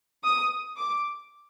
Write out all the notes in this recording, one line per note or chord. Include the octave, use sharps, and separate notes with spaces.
D#6
D6